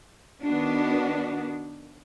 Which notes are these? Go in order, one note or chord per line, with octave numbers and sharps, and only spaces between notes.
D#3 B3 D4 F#4